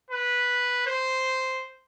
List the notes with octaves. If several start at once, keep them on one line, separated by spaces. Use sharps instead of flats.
B4
C5